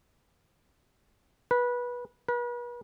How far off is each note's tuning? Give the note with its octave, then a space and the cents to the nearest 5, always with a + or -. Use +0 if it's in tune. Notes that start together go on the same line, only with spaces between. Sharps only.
B4 -20
B4 -40